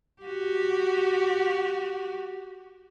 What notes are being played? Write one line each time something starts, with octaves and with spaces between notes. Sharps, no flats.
F#4 G4